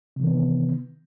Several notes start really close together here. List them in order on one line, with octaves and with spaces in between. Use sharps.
C3 E3 D#3 B3